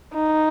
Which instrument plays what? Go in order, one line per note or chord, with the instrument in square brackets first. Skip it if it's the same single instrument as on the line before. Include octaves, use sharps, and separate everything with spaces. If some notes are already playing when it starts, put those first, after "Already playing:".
[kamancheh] D#4